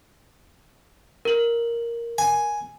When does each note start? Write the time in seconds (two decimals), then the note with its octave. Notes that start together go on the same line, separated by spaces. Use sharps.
1.25 A#4 F#7
2.18 G#5